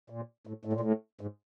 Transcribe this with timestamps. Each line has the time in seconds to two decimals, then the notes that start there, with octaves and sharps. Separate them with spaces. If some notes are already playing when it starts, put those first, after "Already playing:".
0.10 A#2
0.47 A2
0.65 A2
0.73 A#2
0.80 A2
1.21 G#2